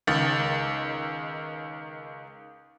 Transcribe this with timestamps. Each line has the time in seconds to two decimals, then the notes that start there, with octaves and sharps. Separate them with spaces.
0.07 C#2 D#3 A6